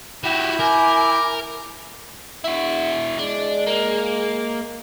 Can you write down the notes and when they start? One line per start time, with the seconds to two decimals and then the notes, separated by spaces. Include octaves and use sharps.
0.24 E4 F#4 G4 B5 G6
0.60 A#4 G#5 D6
2.44 E4 F#4
3.19 G#3 D4
3.67 A#3